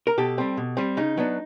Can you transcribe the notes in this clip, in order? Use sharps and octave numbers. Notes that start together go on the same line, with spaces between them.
A#4
B2 G4 A4
G3 C4
B2
G3 C4
C#3 D#4
F#3 B3 D4